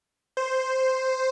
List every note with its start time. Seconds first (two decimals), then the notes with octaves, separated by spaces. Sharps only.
0.37 C5